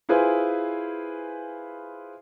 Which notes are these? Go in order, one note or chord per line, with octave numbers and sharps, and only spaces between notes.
E4 F4 G#4 B4 C5 G#5